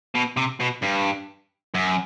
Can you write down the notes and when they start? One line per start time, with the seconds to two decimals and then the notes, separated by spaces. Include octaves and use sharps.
0.15 B2
0.37 C3
0.60 B2
0.83 G2
1.75 F#2